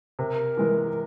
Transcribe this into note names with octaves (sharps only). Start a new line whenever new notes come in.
C3 A#4
E3 G#3